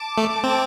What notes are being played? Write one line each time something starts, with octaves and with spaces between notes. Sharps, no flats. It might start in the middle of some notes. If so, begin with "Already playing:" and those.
Already playing: A5 D6
A3
C4